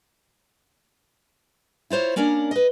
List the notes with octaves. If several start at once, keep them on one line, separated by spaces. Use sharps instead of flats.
E4 F4 C5 C#5
A#3 C#4 D4 A#4 D5
B4 D#5